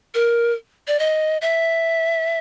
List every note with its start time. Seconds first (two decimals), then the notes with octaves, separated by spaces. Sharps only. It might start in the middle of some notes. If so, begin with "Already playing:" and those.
0.15 A#4
0.88 D5
0.99 D#5
1.41 E5